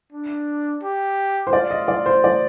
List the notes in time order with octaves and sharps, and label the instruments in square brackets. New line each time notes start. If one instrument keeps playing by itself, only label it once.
[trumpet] D4
G4
[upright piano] C5
[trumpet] F4 [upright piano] D5
[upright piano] D#5
D5
C5
D5